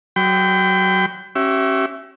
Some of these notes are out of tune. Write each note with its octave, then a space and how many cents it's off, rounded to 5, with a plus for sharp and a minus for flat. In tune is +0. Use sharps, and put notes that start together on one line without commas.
F#3 +15 G5 +0 B5 +45
C#4 -25 G4 -45 E5 +10